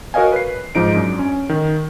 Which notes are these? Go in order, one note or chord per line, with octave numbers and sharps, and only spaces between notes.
F#4 A#4 C#5 D#5 F5 G#5
B4 C7
G#2 F3 D#4 D7
F#2 D4
C#4
D#3